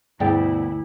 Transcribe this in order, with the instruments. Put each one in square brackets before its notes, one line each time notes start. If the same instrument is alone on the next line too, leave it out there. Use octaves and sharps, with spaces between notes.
[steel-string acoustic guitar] D2 [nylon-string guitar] G2 B2 D4 [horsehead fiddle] E4 [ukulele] G#4 D5 G5